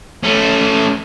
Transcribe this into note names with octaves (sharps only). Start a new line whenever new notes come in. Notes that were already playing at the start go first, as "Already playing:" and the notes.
A3 C#4